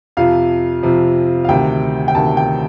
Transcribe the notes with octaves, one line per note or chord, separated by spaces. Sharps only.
F2 C3 F3 F5
F2 C3 F3
F5
D2 C3 D#3 G5
G5
D2 C3 D#3 A5
G5